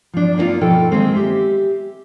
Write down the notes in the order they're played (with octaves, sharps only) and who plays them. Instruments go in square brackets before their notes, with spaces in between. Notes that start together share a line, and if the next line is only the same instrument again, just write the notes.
[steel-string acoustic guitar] F3 D4
A#3 B3 D#4 F4
B2 F3 A4 G5
D#3 G#3 A#3 C4
G4 E5